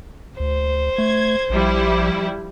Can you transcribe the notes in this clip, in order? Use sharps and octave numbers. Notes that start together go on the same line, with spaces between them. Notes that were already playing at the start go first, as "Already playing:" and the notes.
D2 C5
A3 G#6
A#1 F3 G3 E4